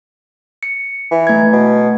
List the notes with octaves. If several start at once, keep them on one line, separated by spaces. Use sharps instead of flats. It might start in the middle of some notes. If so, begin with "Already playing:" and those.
C#7
E3
A3 G#6
B2